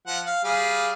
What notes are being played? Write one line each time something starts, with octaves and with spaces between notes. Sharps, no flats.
F3 F#5
F5
G3 G#4 F5